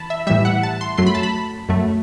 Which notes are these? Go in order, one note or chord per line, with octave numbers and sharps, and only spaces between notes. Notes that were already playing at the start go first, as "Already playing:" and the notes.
Already playing: E3 A5 B5
E5
A2 E3 G3 E5
F#5
A5
C6
F#2 F#3 A3 C6
B5
A5
B5
F#2 F#3 A3